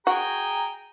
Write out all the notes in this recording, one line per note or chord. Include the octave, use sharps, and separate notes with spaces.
F#4 G#4 G5 A#5